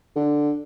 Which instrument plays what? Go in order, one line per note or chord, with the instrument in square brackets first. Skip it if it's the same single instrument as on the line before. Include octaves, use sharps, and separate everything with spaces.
[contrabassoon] D3